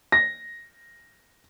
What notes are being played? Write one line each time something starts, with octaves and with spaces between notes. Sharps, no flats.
A#6